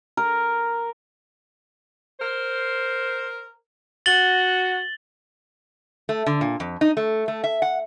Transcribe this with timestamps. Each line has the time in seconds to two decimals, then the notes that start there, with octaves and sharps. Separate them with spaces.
0.17 A#4
2.19 A#4 C5
4.06 F#4 A6 F#7 G7
6.09 A3
6.26 D3
6.41 A#2
6.60 F2
6.81 D#4
6.97 A3
7.28 A3
7.44 E5
7.62 F#5